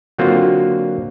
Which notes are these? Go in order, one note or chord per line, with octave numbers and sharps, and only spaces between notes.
D3 F#3 A#3 C4 F4 F#4